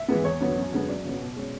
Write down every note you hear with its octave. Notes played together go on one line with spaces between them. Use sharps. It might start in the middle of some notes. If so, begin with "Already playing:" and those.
Already playing: E5
E3 G#3 B3
E2 C#5
D3 F#3 B3
F#2
D3 G#3 B3
F#2 D5
C#3 F#3 B3
B2
G#3 C#4